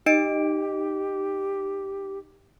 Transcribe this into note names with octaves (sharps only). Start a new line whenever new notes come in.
D#4 G4 D#5 D7